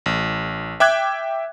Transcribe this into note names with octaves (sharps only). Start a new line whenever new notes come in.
A1
E5 G5 D6 F#6 G#6